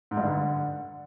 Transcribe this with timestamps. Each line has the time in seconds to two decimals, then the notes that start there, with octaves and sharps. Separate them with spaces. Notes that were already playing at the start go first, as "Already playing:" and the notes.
0.11 G#2
0.17 G2
0.23 D3